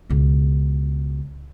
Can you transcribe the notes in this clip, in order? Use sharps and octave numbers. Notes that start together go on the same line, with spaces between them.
C#2 B2